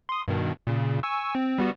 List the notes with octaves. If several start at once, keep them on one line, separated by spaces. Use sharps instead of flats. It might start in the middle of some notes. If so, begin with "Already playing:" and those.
C6 D#6
G2 B2 D#3
A#2 C#3
G#5 C#6 E6
C4
G3 B3 F#4